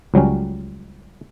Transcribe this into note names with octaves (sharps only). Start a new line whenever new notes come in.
C#2 F#3 G3 C#4